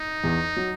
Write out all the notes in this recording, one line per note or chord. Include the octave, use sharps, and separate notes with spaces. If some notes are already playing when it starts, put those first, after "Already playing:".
Already playing: D#4
E2
F#3